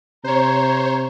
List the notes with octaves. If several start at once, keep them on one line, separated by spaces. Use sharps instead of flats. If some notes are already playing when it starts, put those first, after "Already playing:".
C3 C5 C#5 A#5